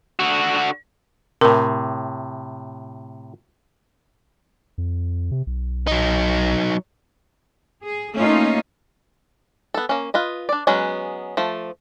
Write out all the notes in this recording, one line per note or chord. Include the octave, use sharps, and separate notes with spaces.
D3 F#4
A2 C3 A#4
F2
C3
B1
F#3 D#4
G#4
A3 A#3 C#4 D#4 F4
B3 A4
A#3 C#4
F4 B4 D#5
D4 D5
F#3 G#3 B3 C#4
F3 A3